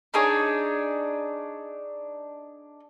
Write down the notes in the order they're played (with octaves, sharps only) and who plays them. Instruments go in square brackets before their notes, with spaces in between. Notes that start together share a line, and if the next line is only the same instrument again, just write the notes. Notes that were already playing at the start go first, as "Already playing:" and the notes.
[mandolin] D4 D#4 G#4 C#5